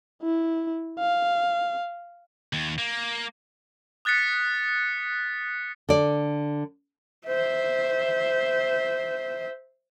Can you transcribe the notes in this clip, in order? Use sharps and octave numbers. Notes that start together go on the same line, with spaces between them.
E4
F5
D#2
A#3
D#6 F#6 A6 B6 C#7
D3 D5
C5 E5